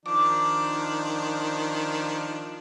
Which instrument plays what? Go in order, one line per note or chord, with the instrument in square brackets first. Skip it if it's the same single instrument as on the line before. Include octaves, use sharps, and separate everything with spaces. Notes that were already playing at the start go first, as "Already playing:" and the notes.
[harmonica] D#3 F3 D4 [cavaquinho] D6